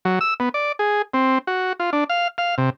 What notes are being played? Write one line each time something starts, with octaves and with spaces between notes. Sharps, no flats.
F#3
E6
B3
D5
G#4
C4
F#4
F4
D4
F5
F5
C3